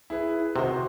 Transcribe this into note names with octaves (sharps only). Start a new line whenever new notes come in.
E4 G#4 B4
C3 D#3 F#4 C5